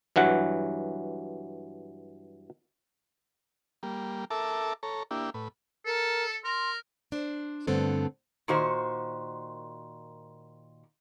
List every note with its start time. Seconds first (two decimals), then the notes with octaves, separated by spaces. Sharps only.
0.16 G2 E3 F#3 F#5
3.83 G3 A#3
4.31 A4 A#4 E5 A5 D6
4.83 A4 C#5 A#5
5.11 A#3 D4 E4 G4
5.34 A2 B4
5.86 A4 A#4
6.44 A#4 C6
7.12 D4 C5
7.67 G2 D3 A3 B3 C4 A4
8.48 A#2 D#3 F#4 C5